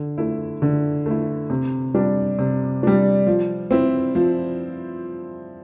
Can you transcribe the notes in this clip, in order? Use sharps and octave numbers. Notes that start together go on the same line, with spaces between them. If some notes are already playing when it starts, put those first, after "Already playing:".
Already playing: D3
A3 E4
D3
A3 E4
C3
G3 D4
C3
G3 D4
F3
C4 E4
F3